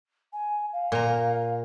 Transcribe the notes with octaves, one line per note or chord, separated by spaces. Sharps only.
G#5
F5
A#2 A#5